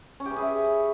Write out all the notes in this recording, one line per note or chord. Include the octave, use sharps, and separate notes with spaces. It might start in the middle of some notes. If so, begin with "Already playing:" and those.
C#4
G4
B4
G#4
E5